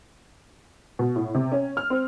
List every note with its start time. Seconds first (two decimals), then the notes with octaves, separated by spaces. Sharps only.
0.99 B2
1.16 A2
1.35 C3
1.52 C#4
1.77 F6
1.90 C4